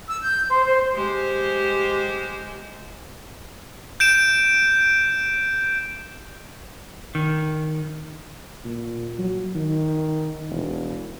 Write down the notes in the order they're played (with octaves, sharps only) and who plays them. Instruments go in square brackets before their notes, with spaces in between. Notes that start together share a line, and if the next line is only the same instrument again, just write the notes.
[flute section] E6
G6
C5
C5
[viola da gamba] G#3 G4 C5
[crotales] G6 D7 E7
[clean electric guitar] D#3
[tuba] A#2
F#3
D#3
E1